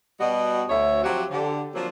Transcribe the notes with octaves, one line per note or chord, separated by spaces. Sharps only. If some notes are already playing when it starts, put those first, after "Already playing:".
B2 G3 F#4 D#5
D2 C#5 E5
F3 F#3 C4 F#4 G4
D3 G4
F3 F#3 A#3 C4 D4 F4